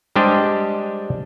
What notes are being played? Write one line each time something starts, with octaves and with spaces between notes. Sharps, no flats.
G3 G#3 D4 G4 C5 D#5